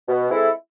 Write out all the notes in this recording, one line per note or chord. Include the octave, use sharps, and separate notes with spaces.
B2
G#3 C4 E4 A4